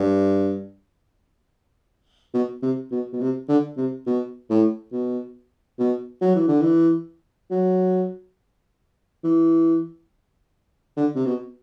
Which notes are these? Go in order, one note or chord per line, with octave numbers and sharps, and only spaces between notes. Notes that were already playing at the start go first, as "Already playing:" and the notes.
Already playing: G2
B2
C3
B2
B2
C3
D3
C3
B2
A2
B2
B2
F#3
E3
D3
E3
F#3
E3
D3
C3
B2